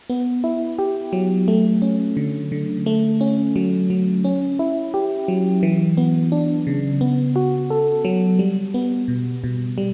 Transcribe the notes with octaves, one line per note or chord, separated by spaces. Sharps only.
B3
E4
G4
F#3
A3
C#4
D3
D3
A3
C#4
F#3
F#3
C#4
E4
G4
F#3
E3
B3
D4
C#3
B3
F#4
A4
F#3
G3
B3
B2
B2
G3